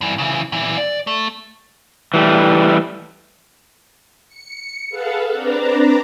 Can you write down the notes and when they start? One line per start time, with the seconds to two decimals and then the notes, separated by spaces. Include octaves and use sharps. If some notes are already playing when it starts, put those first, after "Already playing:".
0.01 G2 E3
0.18 C#3 E3
0.52 A#2 E3
0.78 D5
1.07 A3
2.14 E3 G3 A3
4.28 C#7
4.89 G#4 A4 B4 F5 F#5 A5
5.31 C4 D4 B4 D5 A#5